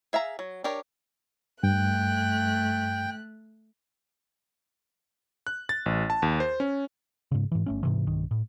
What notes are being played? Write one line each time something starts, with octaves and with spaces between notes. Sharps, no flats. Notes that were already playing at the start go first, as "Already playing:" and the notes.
G#4 E5 F5 A#5
F#3
D4 G4 A#4 C#5 G5
G2 A3 G5 F#6
F#6
A6
A1
A5
D#2
C5
C#4
G#2 C#3
G#2 E3
G1 A3 C#4
G#2 C3 E3
B1 G2 D#3
A2